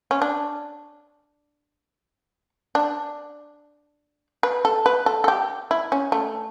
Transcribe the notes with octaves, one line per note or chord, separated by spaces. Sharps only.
C#4
D4
D4
B4
A4
B4
A4
A4
G4
E4
C#4
A3